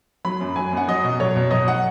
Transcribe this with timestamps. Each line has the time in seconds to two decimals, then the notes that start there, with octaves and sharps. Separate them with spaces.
0.25 F#3 B5
0.40 F#2
0.56 F#3 G#5
0.73 F#2 F#5
0.88 F#3 D#5
1.04 B2
1.20 F#3 C#5
1.36 B2
1.51 F#3 D#5
1.68 F#5